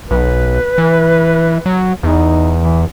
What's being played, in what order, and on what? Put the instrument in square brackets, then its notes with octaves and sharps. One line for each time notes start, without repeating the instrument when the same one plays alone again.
[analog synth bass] B1 [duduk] B4
[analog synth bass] E3
F#3
[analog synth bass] E2 [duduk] D#4
[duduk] E3